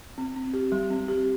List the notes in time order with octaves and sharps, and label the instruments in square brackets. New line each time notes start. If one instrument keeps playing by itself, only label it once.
[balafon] C4
C4
G4
G3
C4
G4